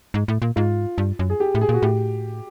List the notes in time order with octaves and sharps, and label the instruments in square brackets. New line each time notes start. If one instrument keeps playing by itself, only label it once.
[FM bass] G#2
A2
A#2
[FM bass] G#2 [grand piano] F4
[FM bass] G2
F#2
[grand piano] G#4
G4
[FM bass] A2
[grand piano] G#4
[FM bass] A#2 [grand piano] F#4
[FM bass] A2 [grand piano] G4